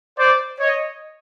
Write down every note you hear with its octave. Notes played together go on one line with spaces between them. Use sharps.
C5 D5
C#5 D#5